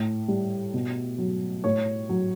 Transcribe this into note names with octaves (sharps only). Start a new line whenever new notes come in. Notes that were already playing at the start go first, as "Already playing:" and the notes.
Already playing: A2
G3
B2
F#3
A2 C#5
F#3